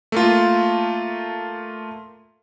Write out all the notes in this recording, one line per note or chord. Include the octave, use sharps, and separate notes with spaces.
A3 A#3 F4